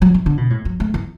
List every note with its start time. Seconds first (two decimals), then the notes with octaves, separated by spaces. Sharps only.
0.02 F#3
0.14 E3
0.26 D3
0.37 B2
0.50 A2
0.65 F#3
0.80 A3
0.94 E3